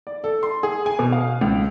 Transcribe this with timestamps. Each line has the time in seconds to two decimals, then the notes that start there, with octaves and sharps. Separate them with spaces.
0.07 D5
0.24 A4
0.43 C6
0.63 G#4
0.86 G#5
0.99 B2
1.12 F5
1.41 C#2